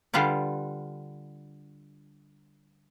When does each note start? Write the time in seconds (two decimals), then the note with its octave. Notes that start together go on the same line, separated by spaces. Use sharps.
0.14 D3 G3 F4 B4 D5